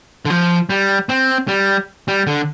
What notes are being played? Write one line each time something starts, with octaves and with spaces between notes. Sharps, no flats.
D3
F3
G3
C4
G3
G3
D3